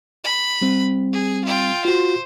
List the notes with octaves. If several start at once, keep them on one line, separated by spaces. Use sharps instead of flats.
B5
G3 C4
G#4
F4 G5
F4 F#4 C5